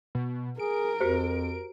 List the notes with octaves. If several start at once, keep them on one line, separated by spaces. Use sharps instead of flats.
B2
G#4 A#4 D7
F2 F#4 G4 C5